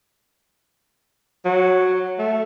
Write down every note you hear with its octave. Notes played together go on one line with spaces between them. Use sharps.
F#3
A3